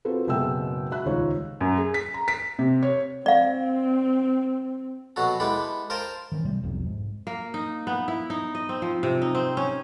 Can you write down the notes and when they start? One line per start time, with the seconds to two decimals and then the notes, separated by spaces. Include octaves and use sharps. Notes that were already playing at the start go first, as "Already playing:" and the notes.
0.05 C4 F4 F#4 A4 B4
0.27 F#1 B2 G#3 E5 G5 E6
0.91 F#4 E5 B5 F#6
1.05 D#1 C#2 D#4 F4 C#5
1.61 F#2
1.78 G#4
1.94 B6
2.14 A#5
2.28 B6
2.59 C3
2.82 C#5
3.26 C4 D5 F5
5.16 B2 F#3 F#4 A4
5.40 G#3 B3 E4 G4 A4
5.90 A#4 C5 F5 G5 A5
6.32 D#3 E3 G3 C#4
6.43 C2 C3 G3 A3
6.63 E1 B1 F2 C3
6.86 G#2
7.27 A#3
7.54 D#4
7.87 B3
8.08 E4
8.30 D#4
8.55 D#5
8.69 C4
8.82 F3
9.03 C3
9.22 D#4
9.35 C4
9.57 C#4